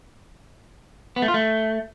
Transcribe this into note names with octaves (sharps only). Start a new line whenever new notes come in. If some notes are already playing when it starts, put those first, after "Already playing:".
B3
A3
F4
A3